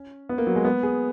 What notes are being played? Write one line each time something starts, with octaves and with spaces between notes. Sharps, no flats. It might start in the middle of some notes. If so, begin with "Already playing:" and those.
Already playing: C#4
B3
A#3
F#3
G#3
B3
G#4